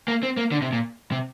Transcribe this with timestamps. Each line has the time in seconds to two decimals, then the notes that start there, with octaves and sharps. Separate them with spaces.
0.08 A#3
0.23 C4
0.37 A#3
0.52 D3
0.62 C3
0.73 A#2
1.12 C3